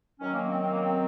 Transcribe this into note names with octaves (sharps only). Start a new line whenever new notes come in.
F#2 D#3 F#3 C#4
A#3
C4
C4
A#3
C4